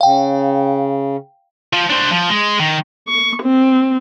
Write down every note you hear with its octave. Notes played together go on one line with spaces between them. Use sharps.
C#3 F5 G5
F3
D4 C5
F3
G#3
D#3
C#6
C4